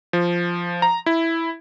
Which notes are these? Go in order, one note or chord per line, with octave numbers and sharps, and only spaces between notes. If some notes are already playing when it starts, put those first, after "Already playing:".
F3
A#5
E4